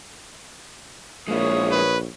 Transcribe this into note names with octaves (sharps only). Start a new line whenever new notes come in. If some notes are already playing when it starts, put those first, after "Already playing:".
A#1 G#3 A#3 E4 C#5 D#6
B4